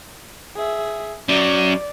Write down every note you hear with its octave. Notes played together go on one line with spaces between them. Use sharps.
G#4 E5
F#2 F#3 D5